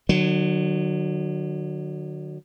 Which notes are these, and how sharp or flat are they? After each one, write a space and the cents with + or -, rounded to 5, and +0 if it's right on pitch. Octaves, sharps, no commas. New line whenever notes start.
D3 +45 F#3 +0